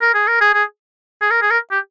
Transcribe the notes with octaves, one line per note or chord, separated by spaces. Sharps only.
A#4
G#4
A#4
G#4
G#4
G#4
A#4
G#4
A#4
G4